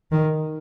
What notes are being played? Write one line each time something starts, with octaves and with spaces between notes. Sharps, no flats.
D#3